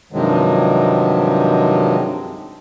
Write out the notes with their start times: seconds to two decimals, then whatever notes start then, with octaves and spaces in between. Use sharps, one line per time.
0.12 G2 C3 D#3 F3 F#3 G#3